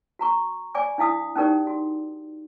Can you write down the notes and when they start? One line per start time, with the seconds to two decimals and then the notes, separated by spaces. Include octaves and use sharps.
0.19 F#4 A#5 C#6
0.75 D5 G#5 D6
0.98 D4 E4 F5 D#6
1.36 C#4 D#4 G4 A#4 D5
1.67 F#4